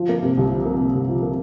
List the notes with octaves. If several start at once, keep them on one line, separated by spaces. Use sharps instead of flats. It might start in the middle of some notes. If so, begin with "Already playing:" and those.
Already playing: F3
A#3
C3
C2
F3
A#3
C3
C2
F3
A#3